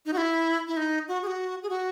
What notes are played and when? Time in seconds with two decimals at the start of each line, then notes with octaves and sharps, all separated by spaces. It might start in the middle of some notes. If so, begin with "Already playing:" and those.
0.06 D#4
0.13 F#4
0.17 E4
0.67 E4
0.77 D#4
1.08 F#4
1.23 G#4
1.27 F#4
1.63 G#4
1.70 F#4